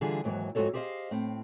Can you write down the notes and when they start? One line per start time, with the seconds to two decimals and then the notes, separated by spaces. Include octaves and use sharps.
0.01 D3 E3 G3 F4 G#4
0.24 D#2 G#2 C#3 E3 F#3
0.55 F2 G#2 F4 F#4 A4 C#5
0.73 G4 G#4 C5 D5 D#5 F5
1.11 A2 C4